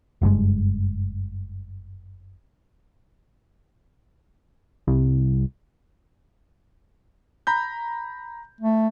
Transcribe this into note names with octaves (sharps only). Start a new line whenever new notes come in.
F#1 G2 A#2 G#3
C2
A#5 B5 G6
A3